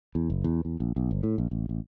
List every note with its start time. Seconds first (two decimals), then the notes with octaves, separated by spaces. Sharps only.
0.15 E2
0.30 F#1
0.44 E2
0.65 E2
0.80 A#1
0.96 B1
1.11 G1
1.23 A2
1.38 A#1
1.51 A1
1.69 A1